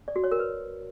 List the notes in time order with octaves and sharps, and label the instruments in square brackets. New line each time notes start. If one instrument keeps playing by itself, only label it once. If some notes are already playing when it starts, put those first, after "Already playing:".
[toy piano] D5
F#4
C#5
A#4
B4